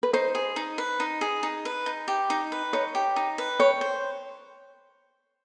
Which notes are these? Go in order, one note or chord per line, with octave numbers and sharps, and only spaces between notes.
B4
D#4 C5
G#4
D#4
B4
D#4
G#4
D#4
B4
D#4
G4
D#4
B4
D#4 C#5
G4
D#4
B4
C#5 G5
C5